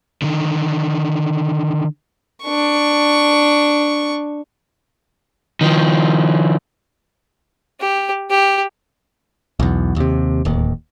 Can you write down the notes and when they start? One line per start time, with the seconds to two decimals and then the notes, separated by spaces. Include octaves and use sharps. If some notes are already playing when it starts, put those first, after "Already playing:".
0.22 D3 D#3
2.44 D4 C#6
5.61 D#3 F3
7.80 G4
8.30 G4
9.60 B1 E2
9.96 D#2 C3
10.45 D1 D#2